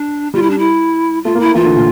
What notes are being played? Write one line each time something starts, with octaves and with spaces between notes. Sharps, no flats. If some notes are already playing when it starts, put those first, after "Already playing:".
Already playing: D4
G3 F4
E4
D4
E4
A3 F4
A#3
E4
A3
E3 F4
D3
A#2